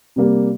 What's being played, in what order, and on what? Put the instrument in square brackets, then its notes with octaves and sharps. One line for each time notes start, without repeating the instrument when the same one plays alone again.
[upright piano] C3 G3 A#3